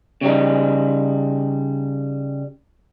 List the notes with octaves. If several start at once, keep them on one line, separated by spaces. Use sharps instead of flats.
C#3 G3 D#4